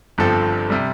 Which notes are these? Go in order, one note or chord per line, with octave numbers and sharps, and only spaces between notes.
G1 G2 F3 C4 A4
C3 G3